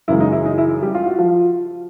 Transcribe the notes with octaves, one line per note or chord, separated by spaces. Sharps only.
F#2 C#3 E3 G#3 E4
D#4
E4
D#4
E4
E4
G3 G4
F4
F#4
F3 F4